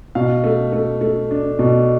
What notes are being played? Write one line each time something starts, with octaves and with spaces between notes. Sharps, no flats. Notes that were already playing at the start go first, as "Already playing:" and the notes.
B2 F5
A3
A3
A3
D4
B2